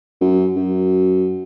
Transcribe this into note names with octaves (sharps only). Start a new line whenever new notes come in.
F#2
F#2